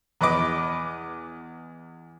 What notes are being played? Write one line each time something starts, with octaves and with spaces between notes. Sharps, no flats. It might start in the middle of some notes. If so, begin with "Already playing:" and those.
E2 B4 D#5 D6